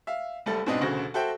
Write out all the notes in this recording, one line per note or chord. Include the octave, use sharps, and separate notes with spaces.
E5 F5
F#1 G3 A3 A4 A6
G#2 B2 C4 D4 D#5
E1 D2 C#3 F#4 C5 A#6
F#4 A4 C5 E5 G5